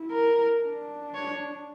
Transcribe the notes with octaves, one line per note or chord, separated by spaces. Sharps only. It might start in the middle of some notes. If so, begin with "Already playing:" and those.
Already playing: E4
A#4
D4
C#5